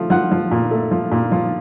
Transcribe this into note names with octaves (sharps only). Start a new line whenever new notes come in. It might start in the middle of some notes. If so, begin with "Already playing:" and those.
Already playing: F3 A3
F3 F#5
F3
A#2
A3
F3
A#2
F3